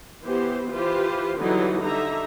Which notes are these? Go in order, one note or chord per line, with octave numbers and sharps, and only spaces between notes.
E3 B3 G4 C5
E3 F4 G4 B4 C5
D3 E3 F#3 G3 D#4
D3 G3 D#4 E5 A#5